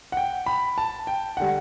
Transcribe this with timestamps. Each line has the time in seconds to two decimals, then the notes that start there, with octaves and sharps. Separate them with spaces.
0.12 F#5
0.17 G5
0.46 B5
0.78 A5
1.07 G5
1.37 D3 G3 F#5